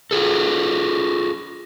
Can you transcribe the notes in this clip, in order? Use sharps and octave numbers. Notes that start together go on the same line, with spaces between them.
F4 G#4 A4